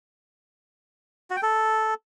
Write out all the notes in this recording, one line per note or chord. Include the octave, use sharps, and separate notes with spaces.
F#4
G5
A4